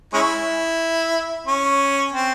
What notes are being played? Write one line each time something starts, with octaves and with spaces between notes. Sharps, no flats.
G#3 C#4 E4
C#4
C4